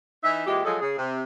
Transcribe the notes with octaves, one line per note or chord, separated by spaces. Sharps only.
E3 D#4 E5
A#2 E3 G#3 G4
F3 F#3 G#3 G#4 A4
C#3 G#4
C3